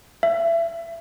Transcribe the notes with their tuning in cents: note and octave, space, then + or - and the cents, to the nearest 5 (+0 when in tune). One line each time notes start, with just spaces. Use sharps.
E5 +25